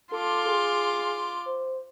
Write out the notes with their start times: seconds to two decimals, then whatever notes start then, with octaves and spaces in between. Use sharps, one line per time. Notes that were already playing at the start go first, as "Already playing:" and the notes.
0.12 F4 A4 C6 D6
0.48 G#4
1.46 C5